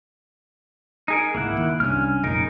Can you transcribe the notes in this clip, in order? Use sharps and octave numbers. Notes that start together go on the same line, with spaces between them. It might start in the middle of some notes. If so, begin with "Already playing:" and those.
D#4 G#4 A#4
G#1 C#2 A#3 E4 F#5
D#2
C2 G2 C#4 F6
F1 A#1 A#2 C#3 D#4 A#4